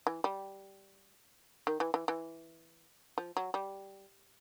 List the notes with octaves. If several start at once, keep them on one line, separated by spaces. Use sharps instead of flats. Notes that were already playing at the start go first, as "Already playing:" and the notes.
E3
G3
D#3
E3
E3
E3
F3
F#3
G3